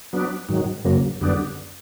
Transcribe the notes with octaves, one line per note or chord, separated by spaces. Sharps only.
F#3 B3 D4
G#2 D#3 F#3
F#2 C#3 F#3 A#3
F#2 D3 G3 B3 D4